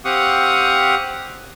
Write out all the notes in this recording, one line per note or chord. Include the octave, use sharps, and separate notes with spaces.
C4 G4 F5 F#5 C#6 D#6